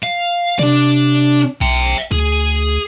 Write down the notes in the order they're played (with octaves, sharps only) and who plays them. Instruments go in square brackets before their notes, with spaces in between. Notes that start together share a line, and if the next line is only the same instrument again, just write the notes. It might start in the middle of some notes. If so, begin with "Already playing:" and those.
[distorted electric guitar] F5
[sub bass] C3 [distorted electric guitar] D4 D5
[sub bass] B1 [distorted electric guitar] E5 G5
[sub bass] D2 [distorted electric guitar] G#4